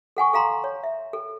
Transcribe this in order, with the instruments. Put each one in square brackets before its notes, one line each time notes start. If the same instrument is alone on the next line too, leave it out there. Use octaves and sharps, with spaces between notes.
[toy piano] A4 F#5 G#5 C#6
A4 F5 A#5 C6
C#5
E5
A4